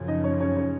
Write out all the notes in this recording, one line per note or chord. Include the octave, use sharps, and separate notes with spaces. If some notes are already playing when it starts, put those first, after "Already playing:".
Already playing: F#2 C#3 F3
D#4 D#5
C#4 C#5
C#4 C#5
C#4 C#5